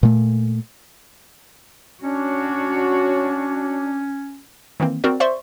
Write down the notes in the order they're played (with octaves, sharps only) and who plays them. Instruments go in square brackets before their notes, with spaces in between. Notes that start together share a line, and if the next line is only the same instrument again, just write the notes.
[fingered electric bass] A#2 A3
[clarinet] C#4 [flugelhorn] D4 [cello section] F#4 C#5
[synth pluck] D#3 E3 A#3 C4
C4 F#4 A#4 D5
C5 D5 E5 C6 C#6